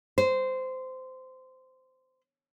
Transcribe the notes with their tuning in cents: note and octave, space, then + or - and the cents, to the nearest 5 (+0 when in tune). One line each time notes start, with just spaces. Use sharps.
C5 -15